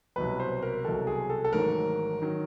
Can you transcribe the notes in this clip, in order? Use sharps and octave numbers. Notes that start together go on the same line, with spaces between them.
C2 B2 F#3 B4
C5
A#4
C2 B2 F#3 A4
G#4
A4
A4
A1 G#2 D#3 F#3 A#4
D#3 F#3